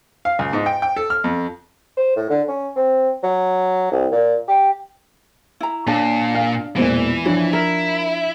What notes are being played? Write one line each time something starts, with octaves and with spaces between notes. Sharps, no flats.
F5
C#2
G#2
G5
G5
A4
F6
F2
C5
A2
D3
C#4
C4
F#3
C2
A#2
G4
E4 A#5
A#2 D4 C#5 A5
F5
E1 A#2 E3 C5
F3 D4 C#5
E4 A#4